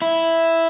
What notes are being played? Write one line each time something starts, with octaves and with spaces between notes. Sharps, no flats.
E4